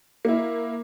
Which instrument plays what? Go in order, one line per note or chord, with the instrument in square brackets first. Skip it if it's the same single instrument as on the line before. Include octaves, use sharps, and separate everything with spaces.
[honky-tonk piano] A#3 E4